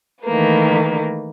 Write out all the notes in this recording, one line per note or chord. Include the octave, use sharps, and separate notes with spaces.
D#3 E3 A3 A#3 B4